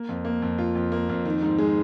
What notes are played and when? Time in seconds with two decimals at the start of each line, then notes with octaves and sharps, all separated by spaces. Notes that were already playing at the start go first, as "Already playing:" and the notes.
Already playing: A#3
0.09 F2
0.25 A#3
0.42 F2
0.58 F4
0.75 F2
0.92 A#3
1.09 F2
1.25 D#3
1.42 G#2
1.58 G#3